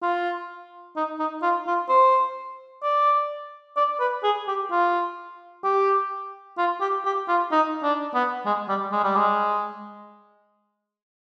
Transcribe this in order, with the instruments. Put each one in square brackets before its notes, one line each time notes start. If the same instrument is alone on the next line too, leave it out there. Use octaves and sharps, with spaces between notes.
[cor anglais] F4
D#4
D#4
F4
F4
C5
D5
D5
B4
G#4
G4
F4
G4
F4
G4
G4
F4
D#4
D4
B3
G#3
G3
G#3
G3
G#3